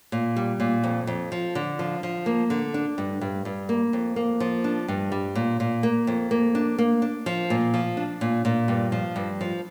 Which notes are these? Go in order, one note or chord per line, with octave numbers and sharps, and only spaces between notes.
A#2
G3
A#2
F2
F2
F3
D3
F3
F3
A#3
D3
D4
G2
G2
G2
A#3
F2
A#3
F3
D4
G2
G3
A#2
A#2
A#3
F2
A#3
D4
A#3
D4
F3
A#2
F3
D4
A#2
A#2
G2
F3
G2
F3